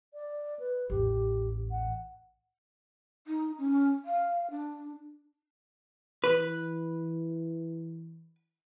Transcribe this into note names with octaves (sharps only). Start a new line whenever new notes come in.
D5
B4
A1 E2 G4
F#5
D#4
C#4
F5
D4
E3 B4